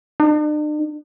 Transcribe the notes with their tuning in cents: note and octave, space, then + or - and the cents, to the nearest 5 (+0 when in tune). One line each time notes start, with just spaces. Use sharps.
D4 +45